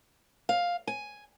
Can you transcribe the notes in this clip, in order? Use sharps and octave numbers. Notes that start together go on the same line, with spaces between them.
F5
G#5